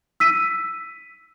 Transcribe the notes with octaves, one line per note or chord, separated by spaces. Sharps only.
E6 B6 D#7